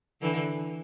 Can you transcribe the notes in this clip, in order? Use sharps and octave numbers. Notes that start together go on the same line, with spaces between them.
D3 E3